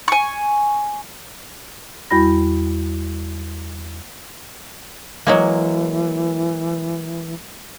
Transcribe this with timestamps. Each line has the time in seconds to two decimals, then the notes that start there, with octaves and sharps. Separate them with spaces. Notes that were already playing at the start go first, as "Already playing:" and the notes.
0.08 G#5 C#6
2.10 E2 G3 E4 F#4 B5 A#6
5.27 E3 F#3 G#3 A#3